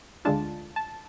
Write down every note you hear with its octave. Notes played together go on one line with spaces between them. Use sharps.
D2 D3 G#3 D4 F4 A5
A5